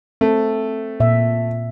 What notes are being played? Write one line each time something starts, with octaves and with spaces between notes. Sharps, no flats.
A3 C4
A#2 E5